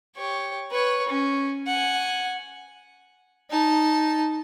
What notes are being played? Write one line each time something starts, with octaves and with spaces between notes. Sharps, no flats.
G4 C#5
B4 C#5
C#4
F#5 G#5
D#4 A5